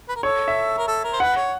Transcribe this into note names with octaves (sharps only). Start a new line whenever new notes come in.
B4
A#4
A4 C#5
E5
A#4
A4
A#4
C5
B4 F#5
C#5